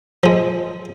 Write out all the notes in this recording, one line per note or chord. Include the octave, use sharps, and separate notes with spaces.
F3 G#3